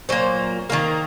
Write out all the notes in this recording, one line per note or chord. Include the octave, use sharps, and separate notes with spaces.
A#2 F#3 A#3 C5
D#3 F#3 A#3 A#4